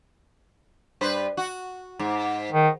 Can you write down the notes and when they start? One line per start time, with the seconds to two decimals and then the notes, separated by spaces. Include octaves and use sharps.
1.01 G2 B4 C5
1.37 F#4
1.99 G#2
2.52 D#3